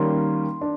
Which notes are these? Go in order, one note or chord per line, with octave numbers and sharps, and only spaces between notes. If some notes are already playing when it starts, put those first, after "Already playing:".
Already playing: D#3 G3 A#3 C#4 C6
D4